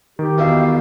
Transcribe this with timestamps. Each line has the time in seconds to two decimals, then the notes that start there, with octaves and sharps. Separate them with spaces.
0.19 D#3 G4
0.38 E2 B2 E5 F5